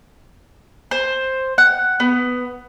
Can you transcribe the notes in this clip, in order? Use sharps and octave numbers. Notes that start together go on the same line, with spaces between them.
C5
F#5
B3